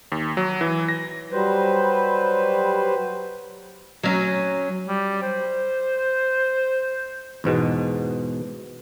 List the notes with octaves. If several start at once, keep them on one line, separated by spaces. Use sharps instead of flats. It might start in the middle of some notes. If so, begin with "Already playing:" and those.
D#2
F#3
E3
A#6
F#3 G3 B4 C5
F#3 C#4
G3
C5
E2 G#2 B2 G#3